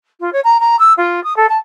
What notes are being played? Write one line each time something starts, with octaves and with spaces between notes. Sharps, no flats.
F4
C#5
A#5
A#5
E6
F4
D#6
A4
A5